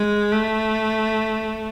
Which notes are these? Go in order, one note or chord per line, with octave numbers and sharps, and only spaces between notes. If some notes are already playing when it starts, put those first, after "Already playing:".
Already playing: G#3
A3